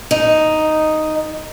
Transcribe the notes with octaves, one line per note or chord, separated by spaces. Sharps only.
D#4